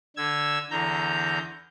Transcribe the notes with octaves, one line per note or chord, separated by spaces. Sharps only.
D3 E6 G#6
E2 D3 A#5 G6